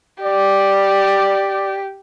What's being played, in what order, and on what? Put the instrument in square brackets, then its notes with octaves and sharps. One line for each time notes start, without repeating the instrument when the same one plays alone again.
[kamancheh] G4 [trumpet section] D5